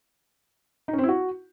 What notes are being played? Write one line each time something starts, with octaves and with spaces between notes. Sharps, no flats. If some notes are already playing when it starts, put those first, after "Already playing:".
D#4
C#4
C4
E4
F#4